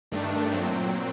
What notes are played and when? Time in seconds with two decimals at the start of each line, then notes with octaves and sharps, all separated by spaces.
0.12 G2 D#3 A3 D4
0.52 A#2 F#3 C4